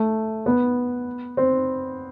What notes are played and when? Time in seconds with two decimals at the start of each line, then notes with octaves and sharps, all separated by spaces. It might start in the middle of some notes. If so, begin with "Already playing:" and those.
Already playing: A3
0.46 B3
1.37 C4